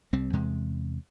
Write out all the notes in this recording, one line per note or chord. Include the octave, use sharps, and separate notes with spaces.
C2 G3 C4
E2 C3 G#3